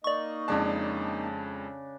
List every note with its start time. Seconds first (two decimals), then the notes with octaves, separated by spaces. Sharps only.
0.04 A#3 D#4 D5 D#5 C#6
0.48 F2 C#3 G#3 D4 A5